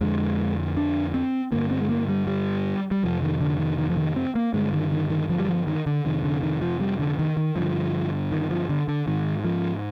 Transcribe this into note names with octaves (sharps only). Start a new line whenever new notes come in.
F2 D3 G#3
D4
C4
G2 D3 A#3
C4
G#3
A#3
G3
G3
G3
F2 C3 F3
D#3
D3
D#3
D#3
F3
D#3
C4
A#3
G2 D3 G#3
D#3
D#3
D#3
F3
G3
F3
D#3
D3
F2 C3 D#3
D3
D#3
F3
G3
D3
D#3
D#3
G2 D3 F3
D#3
F3
D3
D3
G#2 D#3
F3